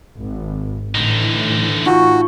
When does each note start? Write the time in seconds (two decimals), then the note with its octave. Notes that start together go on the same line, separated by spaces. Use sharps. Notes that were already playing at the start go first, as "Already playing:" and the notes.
0.16 G#1
0.95 A2 D3 E3 D#4
1.86 D#4 F4 F#4 C#6